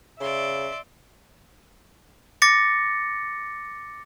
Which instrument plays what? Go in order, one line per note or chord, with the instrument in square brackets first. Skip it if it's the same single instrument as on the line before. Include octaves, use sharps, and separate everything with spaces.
[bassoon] C#3 [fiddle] D5 C6 [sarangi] E5
[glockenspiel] D6 A6 A#6 C#7